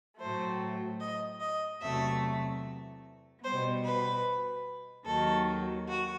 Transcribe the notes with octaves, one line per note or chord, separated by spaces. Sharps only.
A2 F#3 A3 C5
D#5
D#5
E2 C3 F#3 A3 E5
B2 G3 B3 C5
B4
D#2 D#3 F#3 A4
F#4